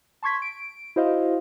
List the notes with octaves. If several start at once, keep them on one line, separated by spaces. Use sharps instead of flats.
A5 C6 C#6 G#6 B6
D7
E4 F#4 C5 D#5 F5